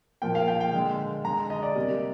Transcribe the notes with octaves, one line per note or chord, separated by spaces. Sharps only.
A#2 F3 A#3 G5
F5
G5
G5
D3 G#3
D3 G#3 A#5
D#5
D5
C3 G3 A#3